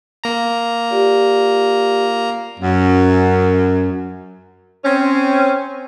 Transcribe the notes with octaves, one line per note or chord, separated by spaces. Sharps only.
A#3 A#5
F4 G4 D5
F#2
C4 C#4